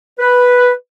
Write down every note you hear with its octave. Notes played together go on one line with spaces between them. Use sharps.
B4